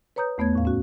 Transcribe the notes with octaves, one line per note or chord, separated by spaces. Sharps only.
B4 C#5 A#5 D#6 G6
E2 A3 B3 C#5 G#6
D#2 A2 F5
C#4 F#4